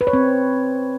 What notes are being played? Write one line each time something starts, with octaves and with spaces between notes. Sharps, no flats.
B4
C#5
C4